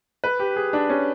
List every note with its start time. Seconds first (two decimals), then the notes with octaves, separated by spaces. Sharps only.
0.24 B4
0.39 G4
0.56 G#4
0.73 D4
0.90 C#4